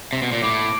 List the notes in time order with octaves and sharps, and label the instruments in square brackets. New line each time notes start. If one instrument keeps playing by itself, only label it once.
[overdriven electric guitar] C3
B2
A#2
[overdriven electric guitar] A2 [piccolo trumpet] D6